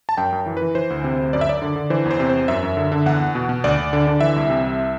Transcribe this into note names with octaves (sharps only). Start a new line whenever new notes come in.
A5
F#2 G5
F#2
E3
B4
E3
E3 C5
D2
C3
D2
F#2 D5
E5
F#2 D5
D3
D3
E3 C5
E2
C5
C3
E2 C5
F#2 E5
F#2
D3
D3
E2 F#5
E2
B2
B2
D2 D5
D2
D3
D3
E3 E5
C2
C3
C2